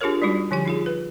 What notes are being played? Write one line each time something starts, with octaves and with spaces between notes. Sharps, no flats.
D4 F4 G4 G#4 A#4 C#5
G3 G#3 D#4 F#4
D3 F3 G4 G#5
D#4 F4 G#4
B4